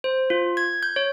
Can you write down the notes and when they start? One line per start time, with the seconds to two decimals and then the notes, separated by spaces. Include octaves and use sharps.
0.04 C5
0.30 F4
0.57 G#6
0.83 G6
0.96 C#5